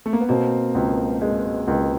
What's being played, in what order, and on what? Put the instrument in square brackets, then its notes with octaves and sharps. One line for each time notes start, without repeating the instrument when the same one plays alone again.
[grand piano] A3
A#3
B3
[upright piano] B2 [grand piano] A#3 C4
[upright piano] C#2
G#3
C#2